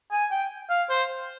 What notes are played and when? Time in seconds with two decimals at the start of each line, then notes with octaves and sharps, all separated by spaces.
0.11 G#5
0.31 G5
0.69 F5
0.89 C5